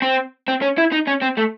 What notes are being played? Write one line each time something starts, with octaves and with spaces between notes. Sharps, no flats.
C4
C4
C#4
E4
D#4
C#4
C4
A3